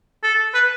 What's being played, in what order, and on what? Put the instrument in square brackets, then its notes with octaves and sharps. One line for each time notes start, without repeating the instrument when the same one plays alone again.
[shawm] A4
B4